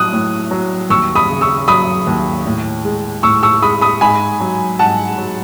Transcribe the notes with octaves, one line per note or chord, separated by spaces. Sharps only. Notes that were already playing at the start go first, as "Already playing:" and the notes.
Already playing: A2 F#3 D#6 F#6
A2
F#3
D#2 C#6 E6
B5 D#6
C#3
C#6 E6
F#3 B5 D#6
D#2
A2
G#3
A2 C#6 E6
C#6 E6
G#3 B5 D#6
B5 D#6
G#2 G#5 B5
F#3
G#2 F#5 A5
F#3